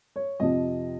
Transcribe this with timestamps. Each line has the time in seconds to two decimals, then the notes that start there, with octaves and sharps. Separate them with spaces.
0.16 C#5
0.40 F2 C3 F3 D#5